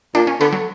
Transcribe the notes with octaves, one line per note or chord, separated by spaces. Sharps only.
A#2 D4
C#4
D3 B3
F#3